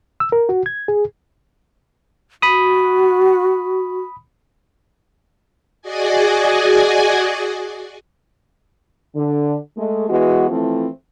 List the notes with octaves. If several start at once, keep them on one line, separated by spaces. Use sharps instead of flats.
E6
A#4
F#4
G#6
G#4
F#4 B5 D#6
F#4 G#4 D5 D#5 G#5
D3
G#3 A3
E3 G#3 B3 F#4
E3 F3 A3 C4 E4